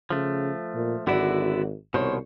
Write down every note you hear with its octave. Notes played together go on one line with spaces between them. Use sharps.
C#3 F3 A3
A#2
G#1 D3 B3 E4 F#4 D5
C2 B2 D#3 C5 C#5